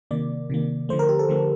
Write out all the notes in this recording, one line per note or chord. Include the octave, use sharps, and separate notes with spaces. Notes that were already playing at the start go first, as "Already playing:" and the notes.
C3 D#3 A#3 D5
C3 D#3 A#3
D3 F3 A3 C5
A#4
G4
A4
D3 F3 A3